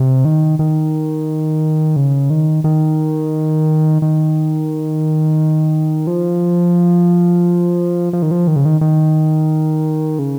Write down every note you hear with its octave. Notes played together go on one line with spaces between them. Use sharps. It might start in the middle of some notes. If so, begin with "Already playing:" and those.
Already playing: C3
D#3
D#3
C#3
D#3
D#3
D#3
F3
F3
D#3
F3
D#3
C#3
D#3
D#3
C#3